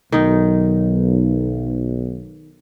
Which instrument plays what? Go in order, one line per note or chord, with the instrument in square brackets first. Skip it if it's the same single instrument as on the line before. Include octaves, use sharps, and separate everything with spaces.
[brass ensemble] B1 [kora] D#3 D#4